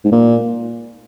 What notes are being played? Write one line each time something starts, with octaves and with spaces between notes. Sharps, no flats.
G#2
A#2